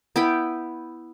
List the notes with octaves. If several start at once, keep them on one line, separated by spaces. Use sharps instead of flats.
B3 E4 G5 B5